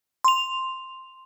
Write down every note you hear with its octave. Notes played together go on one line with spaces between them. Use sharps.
C6 F7